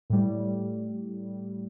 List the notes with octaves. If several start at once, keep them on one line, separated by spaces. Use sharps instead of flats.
A2 G3